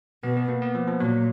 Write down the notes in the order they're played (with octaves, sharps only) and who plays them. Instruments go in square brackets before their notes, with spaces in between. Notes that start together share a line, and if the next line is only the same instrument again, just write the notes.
[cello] B2 [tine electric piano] B3
[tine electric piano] B3
A#3
B3
F3
F3
[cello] A#2 [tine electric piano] F#3